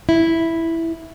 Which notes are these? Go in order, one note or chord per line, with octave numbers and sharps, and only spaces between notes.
E4